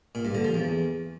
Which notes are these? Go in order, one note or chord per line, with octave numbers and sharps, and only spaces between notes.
A#2
G2
D3
F3
E2